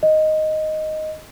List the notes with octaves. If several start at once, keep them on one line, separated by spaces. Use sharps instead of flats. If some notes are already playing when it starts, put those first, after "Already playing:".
D#5